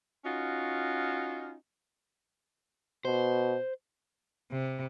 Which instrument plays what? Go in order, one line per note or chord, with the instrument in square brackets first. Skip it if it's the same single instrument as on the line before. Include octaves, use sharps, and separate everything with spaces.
[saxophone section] C#4 D#4 F4 F#4
[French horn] B2 [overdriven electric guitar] C5
[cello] C3